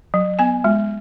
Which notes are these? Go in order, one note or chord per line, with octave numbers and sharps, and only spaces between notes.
F#3
B3 G#5
G#3